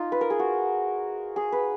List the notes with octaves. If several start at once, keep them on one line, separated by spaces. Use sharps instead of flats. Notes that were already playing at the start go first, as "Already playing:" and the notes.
Already playing: D#4 F4
B4
A#4
G#4
F#4
G#4
B4